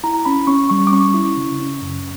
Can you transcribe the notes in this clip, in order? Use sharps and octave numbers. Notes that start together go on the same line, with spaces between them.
E4 A#5
C#4 B5
C#4 C#6
G3 C#6
D6
C#4 C#6
E4
C#3
C#4
F#2